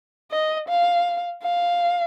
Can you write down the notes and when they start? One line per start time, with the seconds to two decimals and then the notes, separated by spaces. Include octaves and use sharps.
0.32 D#5
0.69 F5
1.43 F5